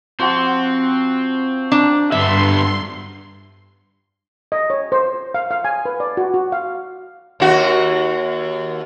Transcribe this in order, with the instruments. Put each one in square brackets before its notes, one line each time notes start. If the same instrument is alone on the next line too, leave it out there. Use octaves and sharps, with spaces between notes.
[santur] F3 F#4 C6 [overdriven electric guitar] C4
[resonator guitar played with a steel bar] D4 [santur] A#5
[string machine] G2 C6 [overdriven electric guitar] D3 B3 [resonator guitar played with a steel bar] E5
[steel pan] D#5
C#5
C5
F5
F5
G#5
B4
D5
F#4
F#4
F5
[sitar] D#2 F#4